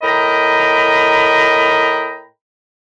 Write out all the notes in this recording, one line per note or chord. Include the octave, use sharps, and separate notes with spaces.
A2 A#4 D#5 G5 A#5 B5